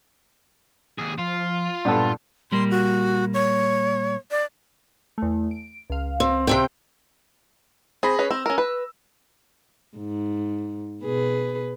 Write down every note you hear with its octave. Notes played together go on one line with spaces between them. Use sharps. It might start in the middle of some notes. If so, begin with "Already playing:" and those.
D#2 G#4
F3 F4
G2 A#2 B3 A4
A#2 G3 A#3 C6
F#4
C#5
D5
E2 A3
D7
C#2 F5
C4
C3 C4 G5
C4 G#4 B5 A#6
C#4 B4
C4 E6
C#4 A#4
B4
G#2
B2 G#4 B4